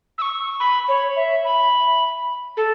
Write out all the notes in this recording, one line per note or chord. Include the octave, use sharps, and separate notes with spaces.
E6
C#6
B5
C#5
E5
B5
A4